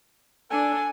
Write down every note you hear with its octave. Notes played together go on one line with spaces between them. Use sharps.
D4 A4 G#5